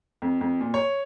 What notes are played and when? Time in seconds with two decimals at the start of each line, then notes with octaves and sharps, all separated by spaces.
0.22 F2
0.41 F2
0.61 A#2
0.74 C#5